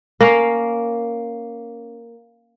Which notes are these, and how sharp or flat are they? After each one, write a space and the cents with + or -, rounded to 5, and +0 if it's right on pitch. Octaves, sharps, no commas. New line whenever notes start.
A#3 +0 C#4 +0 F5 +0